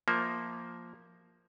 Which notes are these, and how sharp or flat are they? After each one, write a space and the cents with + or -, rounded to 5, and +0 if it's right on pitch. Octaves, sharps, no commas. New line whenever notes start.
F3 +0 A#3 +0 E5 -20